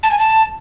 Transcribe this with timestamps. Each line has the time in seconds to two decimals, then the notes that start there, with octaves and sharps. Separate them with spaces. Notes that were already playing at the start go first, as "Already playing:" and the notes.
0.03 A5
0.11 G#5
0.19 A5